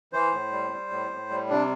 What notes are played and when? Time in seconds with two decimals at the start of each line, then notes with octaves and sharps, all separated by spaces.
0.13 E3 C5
0.32 A2
0.52 G3
0.71 G3
0.90 A2
1.11 A2
1.30 G3
1.49 C3 D4